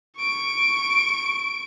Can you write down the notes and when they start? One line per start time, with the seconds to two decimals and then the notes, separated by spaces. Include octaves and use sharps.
0.18 C#6 D7